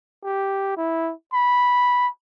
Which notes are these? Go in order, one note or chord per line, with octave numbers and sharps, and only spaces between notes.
G4
E4
B5